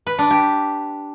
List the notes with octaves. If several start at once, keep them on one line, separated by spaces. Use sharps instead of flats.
B4
D4
G4